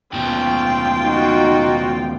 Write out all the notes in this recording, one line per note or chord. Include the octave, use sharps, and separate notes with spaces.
D#2 B2 F4 G5
D#4 F#4